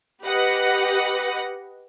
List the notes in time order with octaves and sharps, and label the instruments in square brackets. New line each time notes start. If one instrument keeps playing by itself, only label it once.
[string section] G4 B4 D#5 F#5 F#6